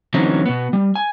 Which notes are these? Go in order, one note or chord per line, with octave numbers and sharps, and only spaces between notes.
D3 E3 F#3 C4 C#4 D#4
B2 B3
G3
G#5